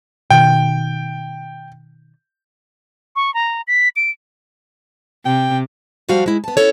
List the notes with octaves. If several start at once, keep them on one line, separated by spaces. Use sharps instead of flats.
B2 D#3 G5
C#6
A#5
B6
D7
C3 G5
F3 G3 F#4 G4 F5
G#3 E4
B3 A5
C#4 E4 A4 C#5